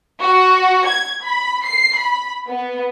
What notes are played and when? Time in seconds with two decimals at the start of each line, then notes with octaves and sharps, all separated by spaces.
0.22 F#4
0.87 G#6
1.23 B5
1.67 C7
1.97 B5
2.47 B3